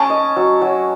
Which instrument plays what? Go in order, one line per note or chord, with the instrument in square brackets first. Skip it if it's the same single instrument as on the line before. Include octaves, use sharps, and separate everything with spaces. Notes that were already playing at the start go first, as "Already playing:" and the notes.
Already playing: [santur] C#4 [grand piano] A5
[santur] D#5
F#3
F#3